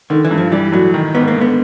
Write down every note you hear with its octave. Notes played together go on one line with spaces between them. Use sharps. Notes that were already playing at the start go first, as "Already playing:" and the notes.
D3 D#3
E3
G2
F3
E3 G3
A2 F#3
D#3
G#2 B3
A#3
D3
B3